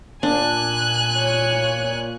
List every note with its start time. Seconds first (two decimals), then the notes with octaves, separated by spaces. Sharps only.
0.23 A#2 D4 G#5 F#6
1.18 C#5